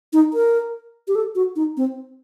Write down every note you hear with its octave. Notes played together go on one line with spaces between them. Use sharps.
D#4
A#4
G4
A4
F#4
D#4
C4